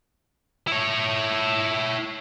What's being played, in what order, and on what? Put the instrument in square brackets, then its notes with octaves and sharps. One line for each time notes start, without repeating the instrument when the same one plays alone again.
[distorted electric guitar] E4 C#5